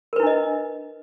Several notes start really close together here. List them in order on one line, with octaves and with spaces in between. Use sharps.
A#4 B4 E4 D4 D#5